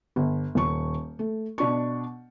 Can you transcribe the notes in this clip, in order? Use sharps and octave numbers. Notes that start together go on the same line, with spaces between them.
G1
D#1 C#6
A3
B2 D4 C#6